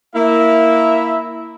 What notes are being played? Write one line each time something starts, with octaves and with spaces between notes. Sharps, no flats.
A#3 E4 E5